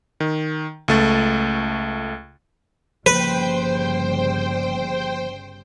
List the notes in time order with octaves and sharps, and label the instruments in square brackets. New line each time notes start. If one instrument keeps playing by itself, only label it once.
[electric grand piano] D#3
C#2 A3 A6
[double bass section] G1 C#3 G3 [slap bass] F3 A#3 [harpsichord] B4 [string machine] C5 G5